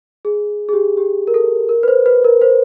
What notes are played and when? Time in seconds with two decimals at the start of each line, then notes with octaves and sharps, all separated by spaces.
0.25 G#4
0.69 G#4
0.73 G4
0.97 G4
1.27 A#4
1.34 A4
1.69 A#4
1.83 B4
1.88 C5
2.06 B4
2.24 A#4
2.42 C5